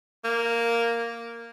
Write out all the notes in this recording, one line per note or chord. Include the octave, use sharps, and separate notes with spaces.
A#3